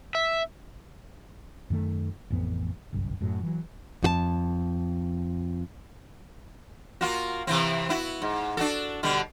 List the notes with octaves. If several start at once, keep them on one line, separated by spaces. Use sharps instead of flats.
E5
F#2 D#3 A3
A1 F2 B3
G1 C2 F#2
F#2 A2 F#3
E3 F#3
F2 F#4 A5
A#3 F4 F#4
C3 E3 C4
B3 E4 F#4
G#2
D4 F#4 A4
B2 D3 G3